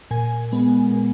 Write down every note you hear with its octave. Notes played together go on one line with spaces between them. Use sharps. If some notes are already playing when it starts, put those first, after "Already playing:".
A#2 G#5
G#3 B3
A#2